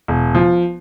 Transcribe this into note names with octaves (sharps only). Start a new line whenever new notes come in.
E1
F3